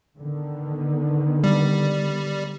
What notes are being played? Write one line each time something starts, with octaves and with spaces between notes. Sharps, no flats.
D3 D#3 B3
G3